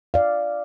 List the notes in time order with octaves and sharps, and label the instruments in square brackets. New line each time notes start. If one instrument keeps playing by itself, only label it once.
[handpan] D5 F5